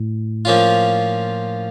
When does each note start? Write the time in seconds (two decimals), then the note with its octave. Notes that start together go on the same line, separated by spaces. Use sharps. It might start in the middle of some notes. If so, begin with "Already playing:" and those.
Already playing: A2
0.45 F3 A#3 C#4 F4